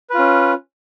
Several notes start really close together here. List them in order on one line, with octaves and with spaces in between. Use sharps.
B4 F4 C#4